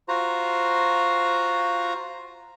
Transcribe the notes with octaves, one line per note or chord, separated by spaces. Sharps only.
F4 F#4 C5 A#5